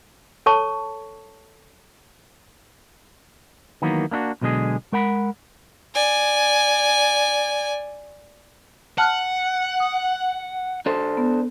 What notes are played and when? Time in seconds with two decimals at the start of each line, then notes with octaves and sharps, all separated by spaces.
0.46 A4 C#5 A5 C#6
3.82 D#3 E3 F#3 A#3 B3
4.11 A#3 D4 E4 F#4
4.41 B1 B2 D3 G#3 G#4
4.92 G#3 A#4 F#5 B5
5.94 D5 G#5
8.98 F#5 A5 F6 F#6
9.80 D#6
10.86 D4 A4 C5
11.17 B3